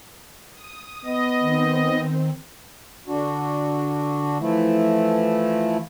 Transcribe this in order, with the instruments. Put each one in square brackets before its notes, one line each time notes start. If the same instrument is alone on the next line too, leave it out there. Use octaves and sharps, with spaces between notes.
[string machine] D#6
[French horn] B3 [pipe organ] D#5
[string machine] D#3 C4
[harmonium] D3 D4 F#4
E3 F3 A3 E4